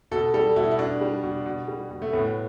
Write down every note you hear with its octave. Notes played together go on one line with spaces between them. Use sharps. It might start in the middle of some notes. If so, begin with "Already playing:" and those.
B2 A4
G3 A4
B2 E4
E4
B2 D4
G3
B2
B2
G3
B2
A3
A2 B3